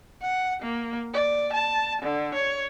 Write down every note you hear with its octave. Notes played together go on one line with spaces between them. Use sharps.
F#5
A#3
D5
A5
D3
C#5